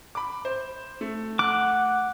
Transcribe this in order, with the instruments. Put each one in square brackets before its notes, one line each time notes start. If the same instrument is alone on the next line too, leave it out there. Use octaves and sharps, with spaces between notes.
[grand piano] B5 D6
C5
A3
[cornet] F#5 [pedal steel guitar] D6 [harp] F#6